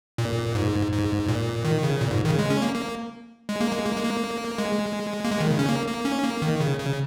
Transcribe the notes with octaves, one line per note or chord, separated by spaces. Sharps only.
A#2
G#2
G#2
A#2
D#3
C#3
A#2
G#2
D#3
C#3
G#3
C#4
A#3
A#3
G#3
A#3
G#3
A#3
G#3
A#3
G#3
A#3
G#3
D#3
C#3
C#4
A#3
A#3
C#4
A#3
D#3
C#3
C#3